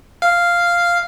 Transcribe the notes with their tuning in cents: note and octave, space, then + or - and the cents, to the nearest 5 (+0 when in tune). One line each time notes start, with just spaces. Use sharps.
F5 -5